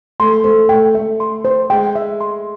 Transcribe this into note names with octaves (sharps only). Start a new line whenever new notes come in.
A3 C6
A3 C5
A3 G5
A3 E5
C6
C5
G#3 G5
E5
C6